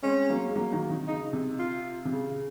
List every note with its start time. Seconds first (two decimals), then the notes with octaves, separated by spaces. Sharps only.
0.03 G#3 C4 C#4
0.29 F#3 A#3
0.48 G#3
0.56 F#3 A#3
0.72 D#3 F#3
0.90 C3 D#3
1.08 C#3 D#4
1.33 C3
1.59 F4
2.05 C3
2.12 C#3